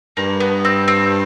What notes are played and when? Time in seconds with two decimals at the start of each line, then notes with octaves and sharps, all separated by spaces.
0.17 G2 A#3
0.40 B3
0.65 C4
0.88 C4